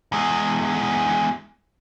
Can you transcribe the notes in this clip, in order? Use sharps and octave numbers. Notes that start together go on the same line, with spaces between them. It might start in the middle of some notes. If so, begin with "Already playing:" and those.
E2 G#3